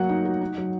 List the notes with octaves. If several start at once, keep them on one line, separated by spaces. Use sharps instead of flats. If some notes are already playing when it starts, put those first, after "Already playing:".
Already playing: F#3 A#3 F#4 F#5
D#4
F#4
D#4
F#3